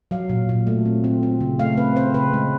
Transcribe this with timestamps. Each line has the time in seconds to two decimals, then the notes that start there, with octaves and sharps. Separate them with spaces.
0.11 F#3 F5
0.29 A#2
0.49 A#2
0.67 A3
0.86 C4
1.04 C4
1.23 C4
1.41 C#3
1.59 A3 F5
1.77 C4 B4
1.96 C4 C5
2.14 C#3 B4
2.33 G#3